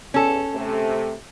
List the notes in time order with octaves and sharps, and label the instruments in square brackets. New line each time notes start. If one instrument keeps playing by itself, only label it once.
[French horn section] E2 [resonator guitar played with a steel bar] C#4 A4
[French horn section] C3 A3